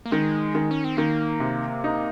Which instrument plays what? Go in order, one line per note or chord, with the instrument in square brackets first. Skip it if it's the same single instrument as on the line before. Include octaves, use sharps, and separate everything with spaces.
[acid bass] A#3
[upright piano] D#3 [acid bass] G#3
[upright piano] D#3
[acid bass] C#4
C4
[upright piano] D#3 [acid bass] A#3
[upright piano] C3
D#4